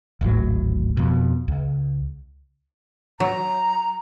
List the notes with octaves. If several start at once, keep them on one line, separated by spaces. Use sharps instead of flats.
D1 G#1 A2 F#3
F2 B2
C#2
F#3 A#5